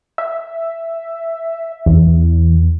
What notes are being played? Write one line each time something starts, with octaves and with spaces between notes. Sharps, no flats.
E5
E2